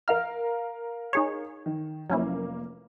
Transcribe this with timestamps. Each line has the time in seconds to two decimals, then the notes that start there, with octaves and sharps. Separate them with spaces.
0.08 A#4 F5 A#5 F6
1.13 D#4 G#4 C#5
1.66 D#3
2.10 F1 F#3 A#3 C#4 E4